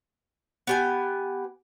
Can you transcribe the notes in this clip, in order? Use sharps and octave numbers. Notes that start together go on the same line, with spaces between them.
B3 G4 G#5